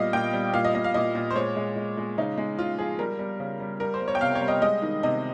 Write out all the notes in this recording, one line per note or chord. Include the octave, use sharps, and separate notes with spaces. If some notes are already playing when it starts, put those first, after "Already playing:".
Already playing: A#2 G3 D#5 F5
A#2 G5
G3
A#2 F5
D#5
A#2 D#5
F5
A#2 D#5
A#2
C5
G#3 C#5
G#3
G#3
G#3
C#3 D#4
G#3
C#3 F4
F3 G#4
G3 A#4
G3
C#3
G3
G3 A#4
C5
G3
C#5
G5
C3 F5
C#5
G3
D#5
G#3 D#5
D#3
C3 D#5